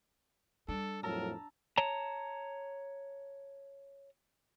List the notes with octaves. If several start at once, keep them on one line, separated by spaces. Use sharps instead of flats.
G3 D4 A4
F2 A2 F#3 A#4 A5 A#5 E6
C#5 A5 A#5